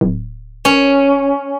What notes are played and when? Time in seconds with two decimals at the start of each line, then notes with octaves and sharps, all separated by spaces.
0.01 D1
0.65 C#4